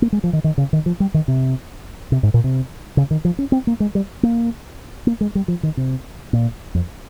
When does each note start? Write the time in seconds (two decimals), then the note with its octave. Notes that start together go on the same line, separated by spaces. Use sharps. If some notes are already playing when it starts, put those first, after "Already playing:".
0.02 A#3
0.12 G#3
0.24 F3
0.33 D#3
0.44 D#3
0.58 C#3
0.73 D#3
0.86 F3
1.00 G3
1.14 D#3
1.28 C3
2.12 C3
2.23 G#2
2.34 A#2
2.44 C3
2.97 C#3
3.11 D#3
3.25 F3
3.39 C#4
3.52 C4
3.67 A#3
3.80 G#3
3.95 G3
4.23 A#3
5.07 A#3
5.21 G#3
5.35 G3
5.48 F3
5.63 D#3
5.77 C3
6.33 A#2
6.75 F2